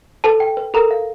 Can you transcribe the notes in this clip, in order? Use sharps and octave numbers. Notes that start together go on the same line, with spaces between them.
A4 B4 A5
G5
B4
A4 A#4 A#5
F5